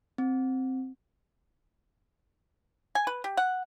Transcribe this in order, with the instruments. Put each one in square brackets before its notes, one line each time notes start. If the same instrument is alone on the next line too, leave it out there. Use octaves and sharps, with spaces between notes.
[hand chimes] C4
[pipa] G#5
B4
G4
F#5